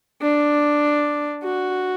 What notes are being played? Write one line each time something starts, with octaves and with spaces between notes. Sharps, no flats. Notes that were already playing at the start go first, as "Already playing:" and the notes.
D4
F#4